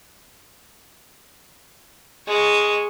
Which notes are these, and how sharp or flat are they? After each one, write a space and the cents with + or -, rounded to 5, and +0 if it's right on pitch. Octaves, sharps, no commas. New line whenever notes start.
G#3 +0 C#6 +0